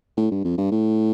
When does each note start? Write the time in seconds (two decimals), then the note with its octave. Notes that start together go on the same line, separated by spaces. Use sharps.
0.17 A2
0.31 G2
0.45 F2
0.58 G2
0.72 A2